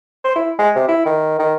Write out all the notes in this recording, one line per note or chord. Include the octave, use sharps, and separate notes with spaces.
C5
E4
G#3
C3
E4
D#3
D#3